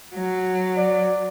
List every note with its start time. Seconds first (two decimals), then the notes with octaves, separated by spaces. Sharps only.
0.14 F#3
0.77 D5